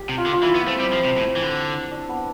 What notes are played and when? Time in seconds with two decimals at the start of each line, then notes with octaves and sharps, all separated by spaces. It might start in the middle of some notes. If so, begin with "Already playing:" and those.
Already playing: G4
0.09 C3
0.18 F4
0.26 D3
0.33 F4
0.42 E3 E4
0.55 B3
0.67 A3 C4
0.80 G3
0.93 F3
1.05 C3
1.17 A2
1.36 E3
1.43 D3
1.91 D4
2.09 B3